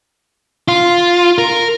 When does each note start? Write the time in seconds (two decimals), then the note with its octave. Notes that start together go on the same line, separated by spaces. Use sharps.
0.68 F4
1.38 A#4